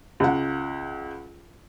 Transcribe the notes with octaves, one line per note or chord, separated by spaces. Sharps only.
C#2 F#5